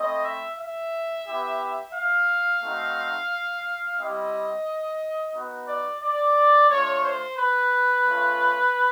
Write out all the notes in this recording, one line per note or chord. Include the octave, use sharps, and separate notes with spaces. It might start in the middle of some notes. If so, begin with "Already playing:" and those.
Already playing: A3 C4 E4 D#5
E5
E5
B3 E4 G4
F5
A3 C4 D#4 F#4
G3 C4 E4 G4 D#5
B3 D#4 F#4
D5
D5
A3 D4 F4 C#5
C5
B4
A3 C#4 F4